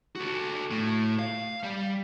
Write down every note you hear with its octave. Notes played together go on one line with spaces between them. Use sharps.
F#4 A4
A2
F5
G3